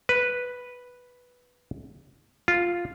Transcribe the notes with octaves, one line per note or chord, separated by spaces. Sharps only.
B4
F4